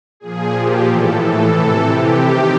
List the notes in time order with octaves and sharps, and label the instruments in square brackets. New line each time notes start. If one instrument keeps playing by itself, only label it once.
[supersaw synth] A#2 F3 G#4
G4
A2 E3 A4
A4
C3 E3
G4
C3 D#3